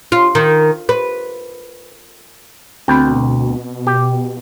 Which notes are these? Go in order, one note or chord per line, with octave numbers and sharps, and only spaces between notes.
F4
D#3
B4
D2 B2 C4 G5 B5
G4